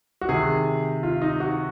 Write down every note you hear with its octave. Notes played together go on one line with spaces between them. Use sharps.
F#4
C3 D#3 G#4
F4
D#4
F#4